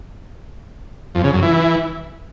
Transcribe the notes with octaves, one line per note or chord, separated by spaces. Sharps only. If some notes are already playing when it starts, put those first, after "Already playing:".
F2
C#3
F#2
E3